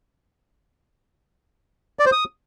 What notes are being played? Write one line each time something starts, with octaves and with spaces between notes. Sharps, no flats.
D5
C5
D#6